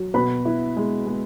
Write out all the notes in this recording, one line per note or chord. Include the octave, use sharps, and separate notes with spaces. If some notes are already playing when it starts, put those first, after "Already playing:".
Already playing: F#3
B2 B4 B5
E4
G#3
G#3